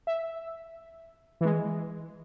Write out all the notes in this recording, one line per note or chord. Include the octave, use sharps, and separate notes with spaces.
E5
E3 G#3